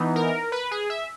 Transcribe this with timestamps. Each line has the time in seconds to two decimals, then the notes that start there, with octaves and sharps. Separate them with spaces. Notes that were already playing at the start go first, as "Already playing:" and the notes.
Already playing: E3 B3 D#4
0.16 A#4
0.52 B4
0.71 G#4
0.90 E5